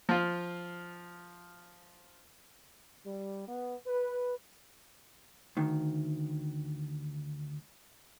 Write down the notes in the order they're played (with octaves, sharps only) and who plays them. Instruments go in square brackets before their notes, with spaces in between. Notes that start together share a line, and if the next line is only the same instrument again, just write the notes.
[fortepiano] F3 F4
[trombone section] G3
B3
B4
[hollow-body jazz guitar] D2 D#3